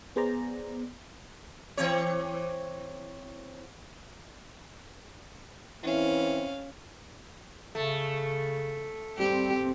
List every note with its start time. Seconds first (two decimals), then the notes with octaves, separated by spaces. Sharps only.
0.16 B3 G#4 C5 D5 A#5
1.77 E3 C4 C#5
5.83 E3 C4 C#4 E4 F5
7.75 C#3 A3
9.19 G3 C4 G4